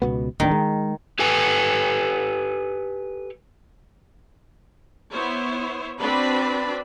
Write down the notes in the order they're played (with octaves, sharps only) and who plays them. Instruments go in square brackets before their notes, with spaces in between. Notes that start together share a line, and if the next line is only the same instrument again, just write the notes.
[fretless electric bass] C#2 B2 B3
[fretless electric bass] D1 A1 D4 [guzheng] D#3
[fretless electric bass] G#3
[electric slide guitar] G4 A4 B4 G#5
[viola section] B3 E4 C5 C#5
C4 D4 F#4 B4 D5 B5